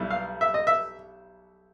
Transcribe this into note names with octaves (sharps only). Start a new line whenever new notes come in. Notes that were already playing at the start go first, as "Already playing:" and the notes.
Already playing: B1 G3 B3 E4
F5
E5
D#5
E5